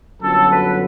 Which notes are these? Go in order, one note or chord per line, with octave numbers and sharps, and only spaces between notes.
G1 F#2 D3 F#3 A4
B4